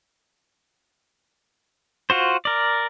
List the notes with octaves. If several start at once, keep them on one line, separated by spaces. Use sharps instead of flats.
F4 F#4 C5
A#4 D5